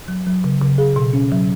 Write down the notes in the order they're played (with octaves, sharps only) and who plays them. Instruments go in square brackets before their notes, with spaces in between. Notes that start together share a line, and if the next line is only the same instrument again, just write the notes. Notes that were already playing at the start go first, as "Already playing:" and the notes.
[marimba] F#3
F#3
C#3
C#3
G#4
B2
C#4
F#3